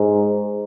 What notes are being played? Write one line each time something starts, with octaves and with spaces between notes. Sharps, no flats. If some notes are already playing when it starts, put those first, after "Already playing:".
Already playing: G#2